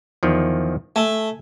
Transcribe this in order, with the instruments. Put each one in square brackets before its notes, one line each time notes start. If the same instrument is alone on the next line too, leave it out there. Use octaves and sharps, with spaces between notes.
[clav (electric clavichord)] E2 D#3 F3
[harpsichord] A3 [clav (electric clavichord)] G#5